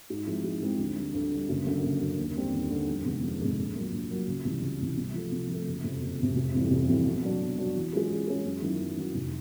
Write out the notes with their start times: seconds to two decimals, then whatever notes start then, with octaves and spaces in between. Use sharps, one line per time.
0.10 G#2
0.27 F3 G#3 C4 E4
0.44 G#2
0.62 F3 G#3 C4 E4
0.79 D2
0.96 D3 G3
1.14 D2
1.32 D3 G3
1.49 F#1
1.66 F#2 D3
1.84 F#1
2.01 F#2 D3
2.18 D#2
2.36 D3 G3 C4
2.53 D#2
2.71 D3 G3 C4
2.88 F2
3.05 C3 D#3 G#3 B3
3.23 F2
3.40 C3 D#3 G#3 B3
3.58 A#1
3.75 A#2 F#3 A#3
3.92 A#1
4.10 A#2 F#3 A#3
4.27 C#2
4.45 C3 E3 G3
4.62 C#2
4.80 C3 E3 G3
4.97 C3
5.14 F3 A3
5.32 C3
5.49 F3 A3
5.67 F#1
5.84 F2 C3
6.02 F#1
6.19 F2 C3
6.36 F1
6.54 F2 C3 E3 G3
6.71 F1
6.88 F2 C3 E3 G3
7.05 B2
7.23 F#3 B3 D4 F#4
7.41 B2
7.58 F#3 B3 D4 F#4
7.75 E3
7.93 G#3 C#4 F4 G#4
8.10 E3
8.28 G#3 C#4 F4 G#4
8.45 F#2
8.62 D#3 F#3 B3 E4
8.80 F#2
8.97 D#3 F#3 B3 E4
9.14 F1